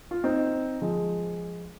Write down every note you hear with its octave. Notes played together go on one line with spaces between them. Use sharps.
F4
C4 D#4
F3 G#3